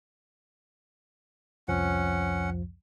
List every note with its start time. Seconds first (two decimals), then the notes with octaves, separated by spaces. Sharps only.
1.68 C2 F2 F3 C#4 F#5